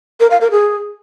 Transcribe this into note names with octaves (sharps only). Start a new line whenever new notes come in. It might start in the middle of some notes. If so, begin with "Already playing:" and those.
A#4
F5
A#4
G#4